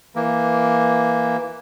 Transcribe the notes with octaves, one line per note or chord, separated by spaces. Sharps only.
E3 A#3